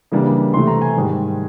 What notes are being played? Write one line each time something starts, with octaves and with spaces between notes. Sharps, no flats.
C#3 E3 G3 A#3 D4
C3 E3 A3 C6
A#5
G#5
G#2 D#3 G3